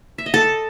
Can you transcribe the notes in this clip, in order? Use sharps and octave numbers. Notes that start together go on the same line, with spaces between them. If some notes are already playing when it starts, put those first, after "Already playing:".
E5
D#5
A4